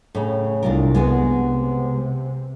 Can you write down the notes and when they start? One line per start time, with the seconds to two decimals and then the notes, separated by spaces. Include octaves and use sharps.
0.15 A2 C#3
0.63 C2 D4 F4 A#4
0.94 G#3 B3 F#4
1.33 C3